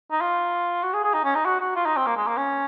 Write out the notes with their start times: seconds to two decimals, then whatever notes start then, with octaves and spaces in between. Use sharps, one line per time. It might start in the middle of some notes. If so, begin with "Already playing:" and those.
0.11 D#4
0.21 F4
0.83 F#4
0.93 G#4
1.04 G#4
1.14 D#4
1.24 C#4
1.35 D#4
1.45 F#4
1.60 F#4
1.75 F4
1.86 D#4
1.96 C4
2.06 A#3
2.17 G#3
2.27 A#3
2.37 C#4